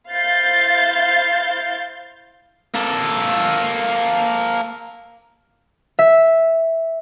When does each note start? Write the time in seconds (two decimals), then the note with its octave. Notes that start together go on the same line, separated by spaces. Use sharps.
0.11 E4 C5 F5 G6 A6 C7
2.75 A#3 A4
5.99 E5